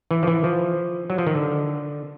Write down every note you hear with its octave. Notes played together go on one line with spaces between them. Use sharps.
E3
F3
E3
F3
F#3
F3
D#3
D3